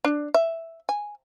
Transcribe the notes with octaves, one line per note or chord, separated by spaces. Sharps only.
D4
E5
G#5